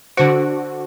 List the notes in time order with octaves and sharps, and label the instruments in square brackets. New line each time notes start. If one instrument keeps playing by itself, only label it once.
[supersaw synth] D3 F#4 [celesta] C5 C#7 D7